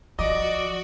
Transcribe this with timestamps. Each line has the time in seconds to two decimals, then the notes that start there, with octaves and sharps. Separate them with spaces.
0.19 F3 F#4 D5 D#5 D6